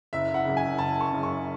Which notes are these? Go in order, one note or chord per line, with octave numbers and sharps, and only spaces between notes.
F#1 E5
F#5
F#2 C#3
G#5
F#1 A5
C#6
F#2 C#3
C#6